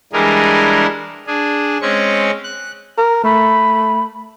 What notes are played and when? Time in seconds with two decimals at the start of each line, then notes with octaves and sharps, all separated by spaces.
0.13 E3 G3 G#3 D4 G#4 A#4
1.27 D4 G#4
1.82 G#3 C4 C#4 C#6
2.44 F#6
2.98 A#4
3.24 A3 B5